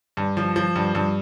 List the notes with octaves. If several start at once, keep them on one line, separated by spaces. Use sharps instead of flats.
G2
F3
F3
G2
G2